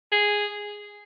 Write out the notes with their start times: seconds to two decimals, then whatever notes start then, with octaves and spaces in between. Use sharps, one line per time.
0.12 G#4